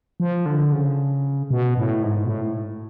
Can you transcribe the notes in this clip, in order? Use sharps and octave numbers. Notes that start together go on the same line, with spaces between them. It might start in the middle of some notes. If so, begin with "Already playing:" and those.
F3
D3
C#3
B2
A2
G#2
B2
A2